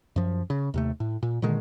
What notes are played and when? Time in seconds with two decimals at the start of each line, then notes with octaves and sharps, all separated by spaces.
0.16 F#2 F3
0.50 C#3
0.74 D#2 C3 A3
1.00 A2
1.23 A#2
1.42 A#2 D3 D#3 G#3